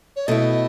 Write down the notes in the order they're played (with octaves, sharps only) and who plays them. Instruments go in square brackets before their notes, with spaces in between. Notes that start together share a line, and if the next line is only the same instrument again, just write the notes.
[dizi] C#5
[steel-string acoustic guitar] B2 A3 E4 [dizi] D#5